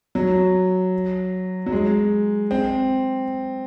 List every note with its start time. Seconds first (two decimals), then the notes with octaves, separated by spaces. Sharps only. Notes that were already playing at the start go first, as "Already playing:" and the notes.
0.15 F#3
1.66 F#3
1.72 G#3
2.51 C4